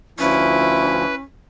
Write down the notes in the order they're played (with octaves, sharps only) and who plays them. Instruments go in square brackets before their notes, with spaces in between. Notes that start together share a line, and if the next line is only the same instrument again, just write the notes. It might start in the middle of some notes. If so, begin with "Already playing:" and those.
[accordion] D2 F3 [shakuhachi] C#4 [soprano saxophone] E4 [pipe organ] B4